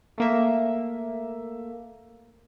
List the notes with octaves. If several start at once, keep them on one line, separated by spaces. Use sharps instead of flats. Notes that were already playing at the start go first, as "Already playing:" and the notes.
A3 A#3 E5